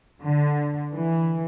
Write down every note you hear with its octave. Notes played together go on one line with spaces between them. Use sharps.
D3
E3